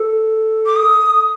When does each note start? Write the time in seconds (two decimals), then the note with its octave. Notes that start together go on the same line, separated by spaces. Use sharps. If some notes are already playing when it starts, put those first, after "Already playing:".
Already playing: A4
0.66 D6
0.76 D#6